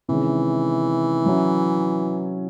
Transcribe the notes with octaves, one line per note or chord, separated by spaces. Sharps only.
C3 D#3 E3 G#3 C#4
F#3 C#4 E4